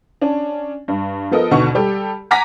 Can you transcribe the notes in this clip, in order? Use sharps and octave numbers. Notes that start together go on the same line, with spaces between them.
C#4 D4
G2
F3 B3 A4 A#4 D#5
D#2 B2 D3 F#4 F#5 C#6
G3 G4 A4
F#5 G#5 A#5 D6 A#6 B6